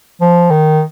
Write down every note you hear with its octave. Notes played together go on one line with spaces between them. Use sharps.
F3
D#3